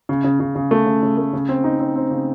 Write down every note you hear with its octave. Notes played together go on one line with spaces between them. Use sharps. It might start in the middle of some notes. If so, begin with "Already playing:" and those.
C#3
C#3
C#3
C#3
A3
C#3
C#3
A3
C#3
C4
D#4
C4
C4
C#3